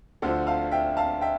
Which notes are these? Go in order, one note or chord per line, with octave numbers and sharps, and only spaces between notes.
D2 D3 F3 A4 C5
F5 A5
E5 G5
F5 A5
E5 G5